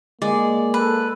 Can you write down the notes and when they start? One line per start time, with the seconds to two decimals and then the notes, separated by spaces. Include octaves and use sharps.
0.22 G#3 A#3 D5
0.74 A4 B4